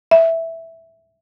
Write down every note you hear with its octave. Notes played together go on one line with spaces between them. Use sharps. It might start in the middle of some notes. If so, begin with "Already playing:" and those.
E5